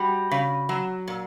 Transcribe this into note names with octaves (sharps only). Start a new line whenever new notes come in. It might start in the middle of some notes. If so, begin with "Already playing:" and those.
Already playing: G3 F#4
C#3
F#3
A#2